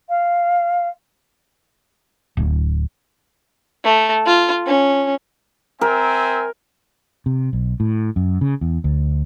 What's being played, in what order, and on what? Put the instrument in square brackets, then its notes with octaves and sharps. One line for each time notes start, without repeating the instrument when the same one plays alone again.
[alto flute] F5
[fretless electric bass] D1
[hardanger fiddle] A3
F4
C#4
[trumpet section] C4 E5 G#5 [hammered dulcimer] A#4
[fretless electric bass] C3
B1
A2
F#2
C#3
E2
D2